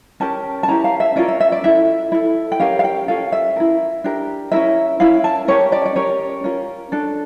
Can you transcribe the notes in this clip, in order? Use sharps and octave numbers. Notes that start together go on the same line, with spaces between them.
C#4 G4 A#4 A5
A5
C#4 E4 G4 A#4 A#5
F5
E5
C#4 F4 A#4 D5
E5
E5
D5
E4 A4 E5
E4 A4
G5
C#4 G4 A#4 F5
F5
G5
C#4 F4 A4 F5
E5
E4 A#4
D4 G4 A#4
C#4 E4 A#4 E5
C#4 E4 A#4 F5
A5
C#4 G4 A#4 C#5
D5
D5
C#4 G4 A#4 C#5
C#4 F4 A#4
D4 A4